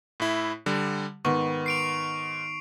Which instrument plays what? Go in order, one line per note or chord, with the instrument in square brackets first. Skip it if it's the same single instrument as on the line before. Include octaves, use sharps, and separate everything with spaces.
[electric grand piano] A2 E4
D3 G3
[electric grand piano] G#2 [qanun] D#3 B3 [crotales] C#6
[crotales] C7 D7 F7